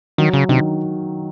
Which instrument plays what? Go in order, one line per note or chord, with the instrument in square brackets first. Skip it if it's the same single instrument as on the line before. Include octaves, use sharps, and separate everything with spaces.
[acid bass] D#3 [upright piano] F#3
[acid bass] C#3
[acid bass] C3 [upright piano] D#3